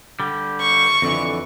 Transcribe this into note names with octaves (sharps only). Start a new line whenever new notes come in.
D3 G3
C#6
F2 D3 E3